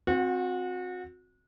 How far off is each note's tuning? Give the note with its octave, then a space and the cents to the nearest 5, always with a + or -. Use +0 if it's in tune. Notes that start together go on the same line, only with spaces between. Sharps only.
C4 +5 F#4 -30 F#5 -10